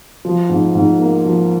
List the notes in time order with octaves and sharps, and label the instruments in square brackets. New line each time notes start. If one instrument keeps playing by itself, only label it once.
[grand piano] F3
G#2
G#2
A#3
F3